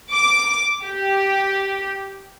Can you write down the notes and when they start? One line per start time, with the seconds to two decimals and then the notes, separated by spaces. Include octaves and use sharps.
0.12 D6
0.85 G4